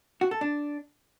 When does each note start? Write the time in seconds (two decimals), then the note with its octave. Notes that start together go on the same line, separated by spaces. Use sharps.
0.21 F#4
0.31 A4
0.41 D4